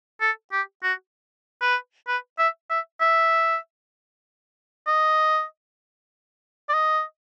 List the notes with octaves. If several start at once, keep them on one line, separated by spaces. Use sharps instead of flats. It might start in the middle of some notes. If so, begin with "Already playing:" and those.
A4
G4
F#4
B4
B4
E5
E5
E5
D#5
D5
D#5